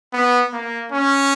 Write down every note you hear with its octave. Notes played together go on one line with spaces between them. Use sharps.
B3
A#3
C#4